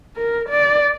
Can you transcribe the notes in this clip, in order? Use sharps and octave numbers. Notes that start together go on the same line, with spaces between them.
A#4
D5